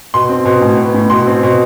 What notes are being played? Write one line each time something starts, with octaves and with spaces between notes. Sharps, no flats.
B2 C6
C4
B2
A2
B3
A2
B2 C6
C4
B2